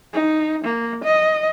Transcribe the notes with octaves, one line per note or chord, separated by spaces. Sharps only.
D#4
A#3
D#5